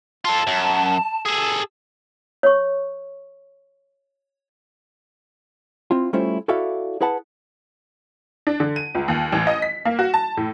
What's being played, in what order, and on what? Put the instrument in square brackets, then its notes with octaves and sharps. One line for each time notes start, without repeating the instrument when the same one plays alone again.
[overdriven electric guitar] F4 A4 [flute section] A5
[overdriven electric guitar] F#2
G#4 A4
[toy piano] C#5 C#6
[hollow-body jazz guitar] C4 E4 F4
G3 A3 C#4 E4 F4 C5
E4 F#4 A4 D5 E5 F5
E4 G#4 B4 F#5 A5
[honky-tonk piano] D4
D3
D#7
C#2
D#2
A1
D#5
B6
A#3
F#4
A5
A2